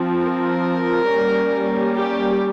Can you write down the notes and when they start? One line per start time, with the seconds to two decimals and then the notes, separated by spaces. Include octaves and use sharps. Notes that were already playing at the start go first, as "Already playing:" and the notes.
Already playing: F3 C4
0.25 A#4
1.11 G3 A#3 C#4
1.98 G4